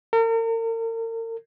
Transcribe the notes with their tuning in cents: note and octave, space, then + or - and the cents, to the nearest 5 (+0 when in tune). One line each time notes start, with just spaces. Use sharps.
A#4 -40